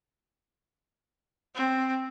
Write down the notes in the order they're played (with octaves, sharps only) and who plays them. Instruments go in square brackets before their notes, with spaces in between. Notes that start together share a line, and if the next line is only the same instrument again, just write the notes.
[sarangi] C4